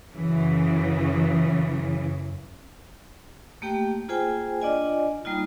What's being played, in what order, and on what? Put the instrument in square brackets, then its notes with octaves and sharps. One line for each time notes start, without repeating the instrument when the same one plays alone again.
[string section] F#2 C#3 E3
[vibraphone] A3 A#3 G4 G5
A#3 F4 G#4 C5 G5 G#5
D4 F4 D5 D#5 G#5
G3 A#3 D#4 F4